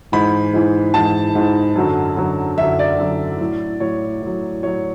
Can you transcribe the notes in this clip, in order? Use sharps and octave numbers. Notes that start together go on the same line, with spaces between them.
G#2 E3 B5
G#2 E3
G#2 E3 A5
G#2 E3
F#2 D3 F#3
F#2 D3 F#3
F#2 D3 F#3 E5
D5
F#2 D3 F#3
A2 F#3
A2 F#3 C#5
A2 F#3
A2 F#3 C#5